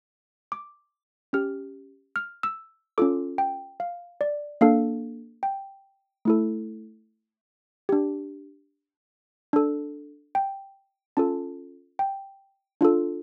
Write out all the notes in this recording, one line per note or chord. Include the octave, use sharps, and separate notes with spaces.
D6
C#4 G4 F6
F6
E6
C#4 F4 A4 D6
G5
F5
D5
A#3 D4 A4 F5
G5
A3 E4 A4
D4 G4
D4 A4
G5
C#4 F4 A4 A5
G5
D4 F4 A4